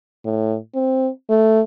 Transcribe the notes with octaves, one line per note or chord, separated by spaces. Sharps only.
A2
C4
A3